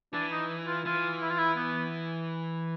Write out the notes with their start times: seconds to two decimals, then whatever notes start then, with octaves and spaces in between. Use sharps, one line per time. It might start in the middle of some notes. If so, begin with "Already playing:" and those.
0.13 E3 D4
0.31 D#4
0.67 F4
0.85 E3 F4
1.22 E4
1.30 F4
1.38 E4
1.58 B3